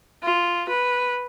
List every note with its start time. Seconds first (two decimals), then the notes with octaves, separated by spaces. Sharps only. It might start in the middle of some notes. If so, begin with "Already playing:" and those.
0.23 F4
0.69 B4